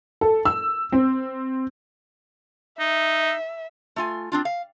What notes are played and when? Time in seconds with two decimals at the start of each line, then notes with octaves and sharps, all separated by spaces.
0.21 A4
0.45 E6
0.92 C4
2.79 D#4 E5
3.96 A3 F4 G#5
4.32 C4 D4 F4
4.45 F5